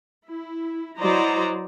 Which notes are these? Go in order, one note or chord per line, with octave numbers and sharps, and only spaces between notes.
E4
F#3 E4 C5 D5 D#5 A#5